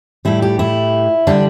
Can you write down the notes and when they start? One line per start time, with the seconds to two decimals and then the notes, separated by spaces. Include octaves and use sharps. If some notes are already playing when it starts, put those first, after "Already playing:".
0.25 A2 G3 E4
0.42 G4
0.59 E4
1.27 D3 G3 D4